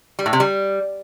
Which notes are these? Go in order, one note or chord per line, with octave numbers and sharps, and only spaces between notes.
G3
A2
C3
G3